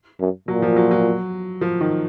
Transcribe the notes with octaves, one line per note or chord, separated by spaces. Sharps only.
F#2
A#2 F#3
F3
F#3
F#3
F3
D#3